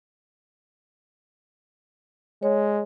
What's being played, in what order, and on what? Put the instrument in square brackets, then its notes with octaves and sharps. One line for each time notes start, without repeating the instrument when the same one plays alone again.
[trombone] G#3 [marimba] C#5